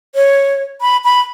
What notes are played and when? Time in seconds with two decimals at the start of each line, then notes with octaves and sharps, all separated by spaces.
0.15 C#5
0.81 B5
1.04 B5